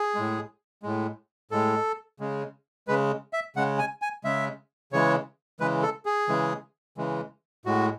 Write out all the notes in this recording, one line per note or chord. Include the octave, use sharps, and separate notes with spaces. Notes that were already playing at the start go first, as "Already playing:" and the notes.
Already playing: G#4
A2 G#3
A2 G#3
A2 G#3 A4
C#3 G#3
C#3 G#3 B4
E5
C#3 G#3 F#5
G#5
G#5
C#3 G#3 E5
C#3 E3 G#3 C#5
C#3 E3 G#3 B4
A4
G#4
C#3 E3 G#3
C#3 E3 G#3
A2 G#3 F#4